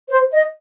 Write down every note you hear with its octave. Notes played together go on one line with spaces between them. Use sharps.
C5
D#5